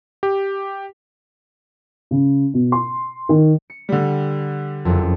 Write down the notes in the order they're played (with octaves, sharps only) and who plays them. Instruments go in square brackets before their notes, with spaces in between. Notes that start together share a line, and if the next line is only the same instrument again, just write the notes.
[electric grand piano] G4
[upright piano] C#3
B2
C6
D#3
[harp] C#7
[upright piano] D3 G3
[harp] F#1 F2